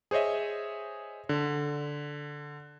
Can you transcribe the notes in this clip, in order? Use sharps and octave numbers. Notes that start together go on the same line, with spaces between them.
G#4 C5 C#5 D#5 E5
D3